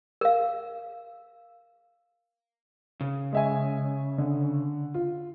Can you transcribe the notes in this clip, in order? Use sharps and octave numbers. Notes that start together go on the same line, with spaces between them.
A#4 F5
C#3
G#3 E5 G#5
D3
F4